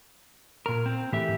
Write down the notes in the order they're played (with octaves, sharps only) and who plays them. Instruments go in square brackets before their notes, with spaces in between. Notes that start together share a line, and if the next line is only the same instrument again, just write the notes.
[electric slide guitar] A#2 A#4
C4
[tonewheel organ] A2 [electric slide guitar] E3 G4 E5